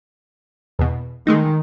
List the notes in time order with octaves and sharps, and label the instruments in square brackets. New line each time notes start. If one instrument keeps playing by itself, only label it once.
[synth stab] E2 B2
[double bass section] D#3 [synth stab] G#3 A3 D#4